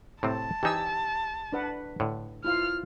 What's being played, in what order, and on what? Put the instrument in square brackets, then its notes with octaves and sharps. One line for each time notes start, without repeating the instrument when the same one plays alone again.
[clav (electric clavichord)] A2 C3 C4 [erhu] A5
[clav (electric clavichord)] E3 D#4 [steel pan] G4 G#5 E6
[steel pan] D4 B4 F#5
[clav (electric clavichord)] A2 D3
[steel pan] E4 F4 F5 [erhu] F6